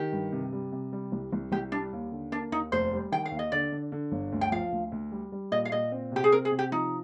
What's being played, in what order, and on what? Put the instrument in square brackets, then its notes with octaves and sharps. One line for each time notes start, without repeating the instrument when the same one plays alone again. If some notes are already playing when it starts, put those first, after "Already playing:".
Already playing: [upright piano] D#3 [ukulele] G4
[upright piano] G2
C3
G3
C3
G3
C2
C2
[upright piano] C2 [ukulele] G4
[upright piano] G3 [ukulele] D4
[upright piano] D#2
D3
[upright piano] A#3 [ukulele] D4
[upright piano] D#2 [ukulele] D#4
[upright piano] F1 [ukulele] C5
[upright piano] G3
[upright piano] D#3 [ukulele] G5
[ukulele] F5
[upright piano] D#2
[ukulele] D#5
[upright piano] D3 [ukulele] D5
[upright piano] D3
D3
G1
D2
[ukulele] G5
[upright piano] F3 [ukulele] F5
[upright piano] D2
D2
G3
G3
[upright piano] A#2 [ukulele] D#5
[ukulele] F5
[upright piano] A#2 [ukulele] D#5
[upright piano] C4
[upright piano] C3 [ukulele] G4
[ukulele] G#4
[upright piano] C4 [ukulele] A#4
[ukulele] G#4
[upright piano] C3
[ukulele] G4
[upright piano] F3 [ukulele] D#4